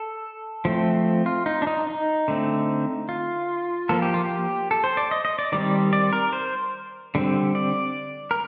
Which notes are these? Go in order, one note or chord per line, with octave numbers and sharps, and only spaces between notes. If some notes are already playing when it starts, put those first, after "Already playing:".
Already playing: A4
F3 A3 C4
F4
D#4
D4
D#4
D#4
D3 A3 C4
F4
F3 A#3 A4
G4
F4
G4
A4
C5
D5
D#5
D#5
D5
D#3 G3 C4 D5
D5
A#4
C5
D3 G3 C4
D5
A#4